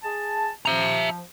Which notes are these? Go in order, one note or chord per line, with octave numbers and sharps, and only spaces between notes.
G#4 A5
F3 E5 A#5